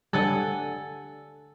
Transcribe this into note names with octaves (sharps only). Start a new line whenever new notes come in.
D3 G3 A4 F#5 G#5